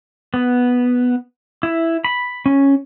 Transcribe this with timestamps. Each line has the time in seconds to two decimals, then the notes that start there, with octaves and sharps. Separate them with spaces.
0.34 B3
1.63 E4
2.05 B5
2.46 C#4